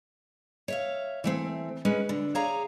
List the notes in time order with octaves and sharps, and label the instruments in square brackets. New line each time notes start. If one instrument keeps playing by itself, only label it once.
[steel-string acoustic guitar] C#5 E5 F5
E3 A3 C4
G#3 C#4 B4
D3
G#4 C#5 D5 F5 A#5